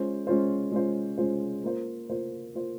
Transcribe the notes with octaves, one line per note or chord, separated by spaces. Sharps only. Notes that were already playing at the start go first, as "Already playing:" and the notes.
Already playing: G#3 C#4 F4 C5
G#3 C#4 F4 C5
G#3 C#4 F4 C5
G#3 C#4 F4 C5
A#3 F4 C5
A#3 F4 C5
A#3 F4 C5